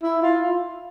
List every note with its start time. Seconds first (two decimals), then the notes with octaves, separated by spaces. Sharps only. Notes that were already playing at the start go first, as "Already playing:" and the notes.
0.02 E4
0.22 F4